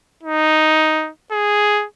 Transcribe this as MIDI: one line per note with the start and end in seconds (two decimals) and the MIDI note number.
0.23 1.10 63
1.32 1.86 68